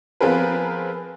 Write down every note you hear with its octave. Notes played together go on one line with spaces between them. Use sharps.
F3 B3 C4 G#4 A#4 B4